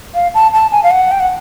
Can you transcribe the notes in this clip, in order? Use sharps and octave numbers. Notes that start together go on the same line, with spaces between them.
F5
A5
A5
G#5
F5
F#5
G5
F#5